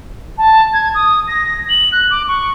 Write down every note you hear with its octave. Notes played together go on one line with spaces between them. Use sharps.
A5
G#6
D#6
A#6
F#7
F#6
D6
C#6